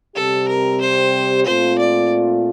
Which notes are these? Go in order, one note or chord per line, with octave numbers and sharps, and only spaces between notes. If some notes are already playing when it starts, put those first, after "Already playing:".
C3 G3 C4 G4 A4
A#4
C5
A#2 A3 C4 F4 C5
D5